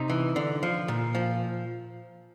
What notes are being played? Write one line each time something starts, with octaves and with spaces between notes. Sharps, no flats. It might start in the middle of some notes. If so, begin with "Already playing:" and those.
Already playing: C3 D#4
E3
D3
F3
A#2
F3